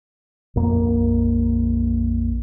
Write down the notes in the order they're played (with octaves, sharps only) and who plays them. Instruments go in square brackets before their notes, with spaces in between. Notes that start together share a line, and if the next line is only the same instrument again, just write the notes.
[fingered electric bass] A#1 F2 A#3